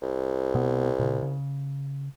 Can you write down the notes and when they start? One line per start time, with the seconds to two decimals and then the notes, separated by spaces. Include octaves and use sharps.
0.02 C2
0.55 B2 B3
0.99 A#2 C#3
1.22 C#3